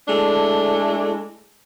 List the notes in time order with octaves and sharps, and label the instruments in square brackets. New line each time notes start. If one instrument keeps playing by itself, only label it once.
[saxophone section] G#3 A3 D4 E4 A4